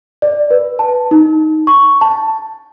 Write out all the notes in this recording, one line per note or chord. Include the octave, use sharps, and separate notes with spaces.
D5
B4
A5
D#4
C#6
A5